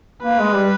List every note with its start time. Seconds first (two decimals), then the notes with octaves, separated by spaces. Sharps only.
0.23 A#3 B4
0.39 G#3
0.54 G3